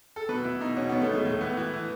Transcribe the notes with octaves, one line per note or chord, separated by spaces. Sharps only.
A4
B2 B4
B2 E4
B2 D#4
B2 C#4
B2 B3
A3
B2 G#3
A2 A3
E3 B3
E3 E4
E3